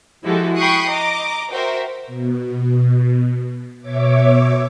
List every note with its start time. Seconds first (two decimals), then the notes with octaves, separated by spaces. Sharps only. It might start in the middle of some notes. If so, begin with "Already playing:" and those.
0.24 F3 G#3 E4 F#4 G4 A4
0.56 G5 B5 C#6 D#6 F#6 C7
0.89 D#5 A#5 D6
1.52 F#4 A#4 C5 E5 G5
2.07 B2
3.81 B2 C#5 E5 D6